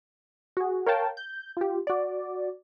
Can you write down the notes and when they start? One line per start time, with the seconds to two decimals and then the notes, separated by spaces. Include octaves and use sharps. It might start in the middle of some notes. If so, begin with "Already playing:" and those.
0.57 F#4 G#4
0.87 A#4 C#5 F5 G5 A5
1.17 G6
1.57 F4 G4
1.87 F#4 D5